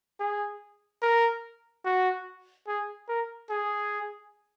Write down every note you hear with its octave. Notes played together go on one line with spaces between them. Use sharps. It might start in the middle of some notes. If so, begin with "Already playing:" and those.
G#4
A#4
F#4
G#4
A#4
G#4